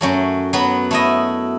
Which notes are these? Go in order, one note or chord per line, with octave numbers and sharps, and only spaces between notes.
F#2 F#3 A3
F#3 B3 B5
A3 E4 D#5